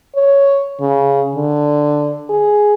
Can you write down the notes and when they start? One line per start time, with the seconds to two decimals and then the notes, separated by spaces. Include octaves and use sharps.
0.15 C#5
0.80 C#3
1.35 D3
2.30 G#4